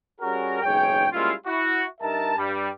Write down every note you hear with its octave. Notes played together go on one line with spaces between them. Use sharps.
G3 C#4 F#4 G#4 A#4
F#1 B1 G#2 G#4 C#5 G5
G3 G#3 A#3 C#4 E4 F4
E4 F#4
G2 D#4 A#4 E5 A5
G2 G3